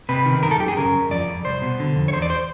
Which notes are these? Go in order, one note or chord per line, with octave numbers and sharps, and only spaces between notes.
C3 B4
D#3
F#2 A#4
A4
F#2 G4
G#4
C#3 A#4
F#2
F2 D5
F2
C2 C5
B2
D3
F2
C#5
E2 C5
D5
C5